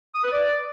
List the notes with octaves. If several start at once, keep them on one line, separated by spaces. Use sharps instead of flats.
D#6
B4
D5